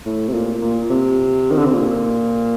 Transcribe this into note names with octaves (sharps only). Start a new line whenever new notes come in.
A2
C3
A#2
A#2
C3
D#3
D3
C3
A#2